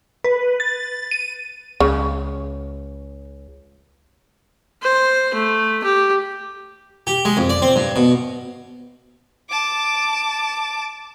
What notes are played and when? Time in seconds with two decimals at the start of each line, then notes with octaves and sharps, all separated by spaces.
0.24 B4
0.60 A6
1.11 D#7
1.80 C#2 C#3
4.83 C5
5.35 A3
5.84 G4
7.07 G4
7.25 G#3
7.37 F2
7.50 D5
7.62 C4
7.76 G2
7.96 B2
9.50 A5 D6